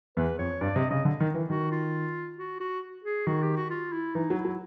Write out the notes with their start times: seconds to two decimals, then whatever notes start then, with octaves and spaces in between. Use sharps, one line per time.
0.17 E2 B4
0.39 F2 C#5
0.61 G2 D5
0.76 C3 D#5
0.90 C#3 D#5
1.05 D3
1.20 D#3
1.34 E3
1.49 D#3 F#4
1.72 F4
2.38 F#4
2.60 F#4
3.04 G#4
3.26 D#3 F#4
3.42 G4
3.56 F#4
3.70 F4
3.92 E4
4.15 E3 D#4
4.30 F#3
4.38 E4
4.45 F#3